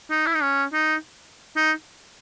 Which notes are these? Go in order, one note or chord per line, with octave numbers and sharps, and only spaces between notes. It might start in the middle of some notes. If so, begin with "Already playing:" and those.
D#4
E4
D#4
C#4
D#4
D#4